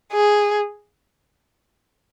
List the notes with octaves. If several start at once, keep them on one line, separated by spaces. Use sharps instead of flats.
G#4